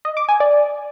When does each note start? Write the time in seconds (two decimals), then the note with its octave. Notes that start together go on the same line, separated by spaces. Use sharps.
0.05 D#5
0.17 D6
0.29 G#5
0.40 D5